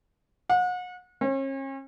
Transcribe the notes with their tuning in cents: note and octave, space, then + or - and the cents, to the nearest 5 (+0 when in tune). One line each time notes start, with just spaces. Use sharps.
F#5 -35
C#4 -40